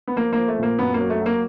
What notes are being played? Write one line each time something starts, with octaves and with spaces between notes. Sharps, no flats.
B3
F3 A#3
F3 A#3
A3
A#2 A#3
F#2 B3
A#3
F#3
A3
F#3
A#3